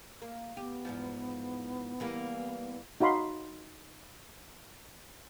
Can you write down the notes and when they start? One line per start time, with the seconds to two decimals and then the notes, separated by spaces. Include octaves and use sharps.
0.22 A#3
0.57 B3 G4
0.85 E2 G#2 F3
2.00 E3 G3 A#3
3.00 D#4 F#4 F5 B5 C6